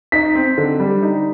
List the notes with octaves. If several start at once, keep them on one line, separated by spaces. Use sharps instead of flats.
D#4 B6
C4
D3
G3
D#4